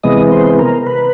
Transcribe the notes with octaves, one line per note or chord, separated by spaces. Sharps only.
C3 E3 G#3 B3 D#5
C5
A#4
B4